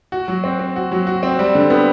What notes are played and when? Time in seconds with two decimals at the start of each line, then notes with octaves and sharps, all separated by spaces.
0.12 F#4
0.28 F#3
0.44 C4
0.59 C4
0.76 F#4
0.92 F#3
1.07 F#4
1.23 C4
1.39 G3
1.55 D3
1.70 B3